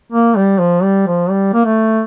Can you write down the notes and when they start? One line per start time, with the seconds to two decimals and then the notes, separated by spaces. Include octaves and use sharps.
0.12 A#3
0.36 G3
0.59 F3
0.83 G3
1.07 F3
1.30 G3
1.53 A#3
1.65 A3